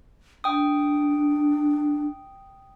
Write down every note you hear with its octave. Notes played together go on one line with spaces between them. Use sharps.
D4 G5 D#6